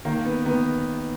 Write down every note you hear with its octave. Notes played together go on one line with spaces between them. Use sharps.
D#3 A#3
B3
D#3 B3